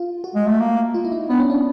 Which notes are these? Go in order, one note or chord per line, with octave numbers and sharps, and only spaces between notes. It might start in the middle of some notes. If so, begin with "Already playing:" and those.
Already playing: F4
F#4
G#3
A3
A#3
F4
E4
D#4
B3 D4
C#4
D4